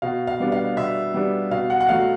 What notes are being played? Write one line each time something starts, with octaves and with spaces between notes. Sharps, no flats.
B2 F5
F5
G3 B3 D4
F5
B2 E5
G3 B3 D4
B2 F5
F#5
F#5
F#3 A3 F5